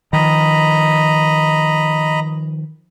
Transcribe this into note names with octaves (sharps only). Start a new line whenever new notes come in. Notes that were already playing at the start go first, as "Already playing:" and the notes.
D#3 F3 D#5 A#5 B5